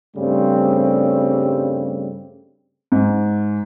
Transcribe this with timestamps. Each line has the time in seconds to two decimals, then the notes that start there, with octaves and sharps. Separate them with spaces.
0.17 G2 C#3 G3 A3 C4
2.92 G#2